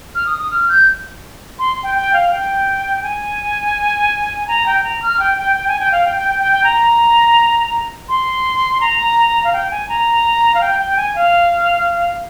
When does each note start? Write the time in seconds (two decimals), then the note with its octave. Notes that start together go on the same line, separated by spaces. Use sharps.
0.15 F6
0.26 D#6
0.39 D#6
0.51 F6
0.69 G6
1.59 C6
1.83 G5
1.95 G5
2.13 F5
2.31 G5
3.03 G#5
4.48 A#5
4.66 G5
4.84 A#5
5.02 F6
5.20 G5
5.38 G5
5.56 G5
5.68 G#5
5.80 G5
5.92 F5
6.05 G5
6.16 G5
6.29 G5
6.40 G5
6.52 G5
6.64 A#5
8.09 C6
8.81 A#5
9.44 F5
9.53 G5
9.71 G#5
9.89 A#5
10.54 F5
10.61 G5
10.79 G5
10.97 G#5
11.15 F5